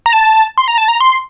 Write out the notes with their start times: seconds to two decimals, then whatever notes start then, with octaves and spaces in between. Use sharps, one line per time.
0.06 A#5
0.13 A5
0.58 C6
0.68 A#5
0.78 A5
0.88 A#5
1.01 C6